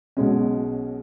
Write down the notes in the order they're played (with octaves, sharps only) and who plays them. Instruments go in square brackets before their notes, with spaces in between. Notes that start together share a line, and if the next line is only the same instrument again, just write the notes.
[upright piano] B1 B2 G#3 C#4